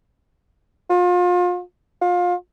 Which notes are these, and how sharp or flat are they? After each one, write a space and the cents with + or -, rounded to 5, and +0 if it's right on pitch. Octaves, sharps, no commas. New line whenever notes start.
F4 +35
F4 +25